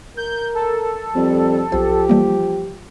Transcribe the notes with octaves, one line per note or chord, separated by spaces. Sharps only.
A#4 G6
A4
F2 G3
B1 F3 G4 C5
E3 G3 A#3